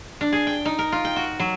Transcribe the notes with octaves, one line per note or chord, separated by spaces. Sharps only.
D4
G#4
G5
D#4
A#4
F4
G5
F#4
F#3